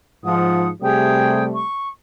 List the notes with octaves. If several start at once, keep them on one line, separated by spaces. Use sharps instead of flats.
G#2 F3 F#5 D#6
C3 G3 A3 G#4 G5 D#6
C#6